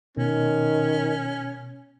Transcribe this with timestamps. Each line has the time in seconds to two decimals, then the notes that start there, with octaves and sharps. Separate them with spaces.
0.17 B2 D#3 C#4